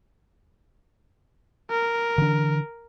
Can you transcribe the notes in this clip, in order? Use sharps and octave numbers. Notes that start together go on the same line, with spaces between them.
A#4
D3 E3 D4